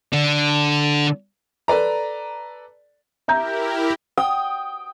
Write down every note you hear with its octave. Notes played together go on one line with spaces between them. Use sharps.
D3 D4
A4 B4 D5 A#5
E4 G4 A#4 E5 A#5 G6
G5 D#6